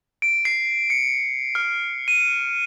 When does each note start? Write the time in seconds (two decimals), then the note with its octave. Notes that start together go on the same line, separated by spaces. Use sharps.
0.22 D7
0.45 C7
0.90 C#7
1.55 F6
2.08 D#7